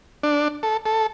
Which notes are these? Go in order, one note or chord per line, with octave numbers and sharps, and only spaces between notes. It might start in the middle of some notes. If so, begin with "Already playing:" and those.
D4
A4
A4